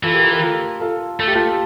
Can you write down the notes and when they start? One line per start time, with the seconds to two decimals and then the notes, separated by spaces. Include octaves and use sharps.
0.03 E3 F4 A4
0.13 G4 A#4
0.22 F4 A4
0.32 G4 A#4
0.42 F4 A4
0.80 F4 A4
1.19 A3 A4
1.27 G4
1.34 F4 A4